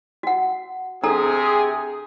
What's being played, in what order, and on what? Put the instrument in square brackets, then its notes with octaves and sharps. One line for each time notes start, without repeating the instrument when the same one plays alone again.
[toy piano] F#4 F#5
[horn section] C3 G#4 [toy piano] D4 A4 A#5